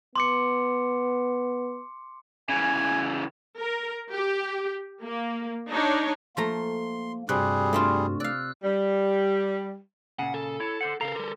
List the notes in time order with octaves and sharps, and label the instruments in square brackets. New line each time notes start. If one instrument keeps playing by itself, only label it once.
[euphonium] B3 [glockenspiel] C6 D6 C#7
[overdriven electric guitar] C#3 E3 [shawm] G#5
[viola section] A#4
G4
A#3
D4 D#4 C#5
[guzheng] F3 A3 A#5 [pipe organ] A#3 [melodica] C6
[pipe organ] G2 F#4 [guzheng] C3 [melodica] G3 G#4 [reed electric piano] F#6
[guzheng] C3 C4 F4 [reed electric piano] A3 D4
[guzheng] D5 F5 [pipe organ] E6 F#6
[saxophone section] G3
[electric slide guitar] A#2 C#3 [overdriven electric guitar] F#5
[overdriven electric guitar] A4
[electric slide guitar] E4 C#5
D3 C5 F#5
[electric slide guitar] C#3 F5 A#5 [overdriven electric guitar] A4 A#4
[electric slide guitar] D3 G3